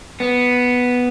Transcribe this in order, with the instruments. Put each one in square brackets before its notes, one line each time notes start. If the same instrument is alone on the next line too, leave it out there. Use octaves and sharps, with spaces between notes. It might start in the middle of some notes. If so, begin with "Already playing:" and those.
[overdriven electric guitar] B3